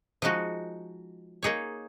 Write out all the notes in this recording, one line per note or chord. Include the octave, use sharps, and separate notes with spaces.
F3 G#3 D#4 F#4
A#3 D#4 G#4 C#5